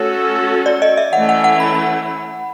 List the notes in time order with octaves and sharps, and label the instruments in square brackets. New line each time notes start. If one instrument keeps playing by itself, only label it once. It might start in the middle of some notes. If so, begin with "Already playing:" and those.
Already playing: [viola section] A3 C#4 F#4 A4 [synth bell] C#5
[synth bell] D5
D#5
E5
[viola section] E3 A3 C#4 [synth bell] F#5
[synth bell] F#5
F#5
B5
B5